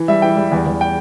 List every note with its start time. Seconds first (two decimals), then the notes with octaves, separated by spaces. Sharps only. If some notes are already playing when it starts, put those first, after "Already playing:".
Already playing: E3
0.08 G3 E5
0.22 E3 G5
0.37 G3
0.51 E2
0.66 E2
0.81 G5